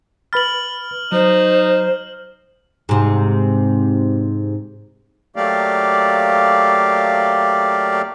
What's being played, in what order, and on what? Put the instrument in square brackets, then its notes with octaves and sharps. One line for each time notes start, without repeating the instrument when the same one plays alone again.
[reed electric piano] B4 B5 A6 [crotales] F6 F#7
[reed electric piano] F#3 [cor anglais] D#4 [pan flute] C5
[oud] G#2 C3
[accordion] F#3 A3 A#3 G4 D5 F5